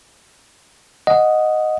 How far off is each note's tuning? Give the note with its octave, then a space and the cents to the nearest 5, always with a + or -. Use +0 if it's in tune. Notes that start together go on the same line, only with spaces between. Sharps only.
D#5 +0 F#5 -10